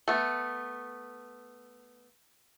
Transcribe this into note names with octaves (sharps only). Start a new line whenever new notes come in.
A3 B3